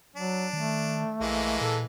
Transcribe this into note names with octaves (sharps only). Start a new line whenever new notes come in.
F#3 D4
D#3 A3
A#1 E3 G#3 A#3
A#2 A4